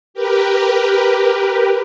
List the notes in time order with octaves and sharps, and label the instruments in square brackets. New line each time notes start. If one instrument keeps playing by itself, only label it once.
[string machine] G4 A#4 B4